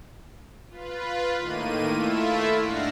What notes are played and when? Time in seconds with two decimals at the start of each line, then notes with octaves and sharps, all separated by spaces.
0.69 F4 B4
1.36 A2 D#3 A#3 D#7
1.86 A3 E4 F4 E5
2.60 G#2 D4 F5 F#5 A#6 C7